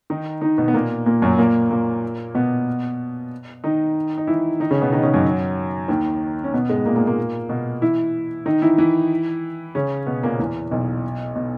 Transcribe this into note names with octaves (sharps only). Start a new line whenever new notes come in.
D#3 D#4
D#3 D#4
B2 B3
B3
A#2 A#3
A#2 A#3
F#2 F#3
A#2 A#3
A#2 A#3
B2 B3
D#3 D#4
D#4
E3 E4
D#3 D#4
C#3 C#4
B2 B3
D#3 D#4
C#3 C#4
F#2 F#3
D#2 D#3
C#4
B2 B3
G#2 G#3
A#2 A#3
A#2 A#3
A#2 A#3
B2 B3
E3 E4
D#3 D#4
E3 E4
E3 E4
C#3 C#4
B2 B3
A#2 A#3
E2 E3
B1 B2
B2